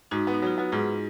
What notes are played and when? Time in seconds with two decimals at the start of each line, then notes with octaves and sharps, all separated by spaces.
0.11 G#2 D#4 F#4
0.27 B3
0.34 D#4
0.42 F#3 F4
0.58 B3 F#4
0.72 G#2 F4 G#4